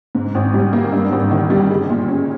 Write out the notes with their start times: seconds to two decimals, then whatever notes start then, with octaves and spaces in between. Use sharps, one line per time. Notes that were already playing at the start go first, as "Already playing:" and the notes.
0.15 G#2
0.35 G#1
0.54 G3
0.73 A#3
0.92 G2
1.12 G#1
1.31 D#3
1.50 G3
1.70 G#3
1.90 A#2
2.08 C#4